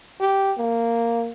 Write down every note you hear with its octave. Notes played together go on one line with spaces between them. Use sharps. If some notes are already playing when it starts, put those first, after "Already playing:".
G4
A#3